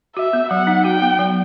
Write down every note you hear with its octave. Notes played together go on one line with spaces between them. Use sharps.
F#4 E5
B3
F#3 F#5
D#4
F#4 G5
B3
F#3